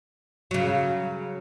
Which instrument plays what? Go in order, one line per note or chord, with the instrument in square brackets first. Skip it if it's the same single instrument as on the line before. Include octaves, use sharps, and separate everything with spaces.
[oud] C#3 F#3